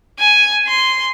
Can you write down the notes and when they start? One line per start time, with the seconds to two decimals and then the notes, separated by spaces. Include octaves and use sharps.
0.19 G#5
0.67 C6